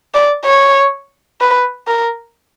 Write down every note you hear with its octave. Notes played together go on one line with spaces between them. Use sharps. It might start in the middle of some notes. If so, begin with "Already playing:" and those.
D5
C#5
B4
A#4